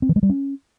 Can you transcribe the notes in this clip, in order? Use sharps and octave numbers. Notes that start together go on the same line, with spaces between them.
C4
E3
G#3
G3
C#4